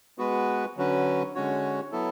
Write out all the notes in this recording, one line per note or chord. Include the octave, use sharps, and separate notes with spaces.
G#3 B3 F#4 B4
D3 F#3 C#4 F#4 B4
D3 G#3 C#4 F#4 C#5
F#3 B3 E4 A4